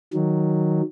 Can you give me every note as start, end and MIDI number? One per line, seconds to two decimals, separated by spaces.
0.14 0.82 51
0.14 0.82 54